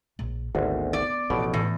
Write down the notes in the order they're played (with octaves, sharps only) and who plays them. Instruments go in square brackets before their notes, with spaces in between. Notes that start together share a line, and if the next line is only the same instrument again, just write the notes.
[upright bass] A#1
[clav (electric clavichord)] G#1 D2 [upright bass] B3
[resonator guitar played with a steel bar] D5
[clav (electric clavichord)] A1 B2 [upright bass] F3
[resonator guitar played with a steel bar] E2 [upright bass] A2